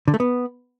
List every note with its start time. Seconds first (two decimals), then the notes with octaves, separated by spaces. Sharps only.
0.08 D3
0.14 A3
0.20 B3